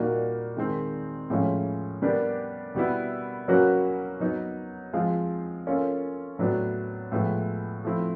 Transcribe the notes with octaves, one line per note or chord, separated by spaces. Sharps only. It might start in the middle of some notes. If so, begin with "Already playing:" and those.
Already playing: A#2 G3 A#3 D#4 F#4
D#3 G#3 C4
A2 F3 G#3 C#4 F4
G3 B3 D4 G4 A#4
B2 G3 B3 E4
F#3 A#3 C#4 F#4 B4
F#3 B3 D#4
F3 G#3 C4 F4
A#3 C#4 F4 A4
A2 F#3 B3 D4
A2 F3 G#3 B3 E4
F3 A3 C4 E4